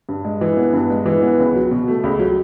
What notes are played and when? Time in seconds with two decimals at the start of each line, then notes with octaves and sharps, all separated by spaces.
0.09 G2
0.25 G#3
0.41 E3
0.57 B3
0.73 G2
0.90 G#3
1.06 E3
1.22 B3
1.38 C#2
1.55 F#3
1.71 B2
1.88 A3
2.04 C#2
2.19 F#3